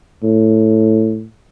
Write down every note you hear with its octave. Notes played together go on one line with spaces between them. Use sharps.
A2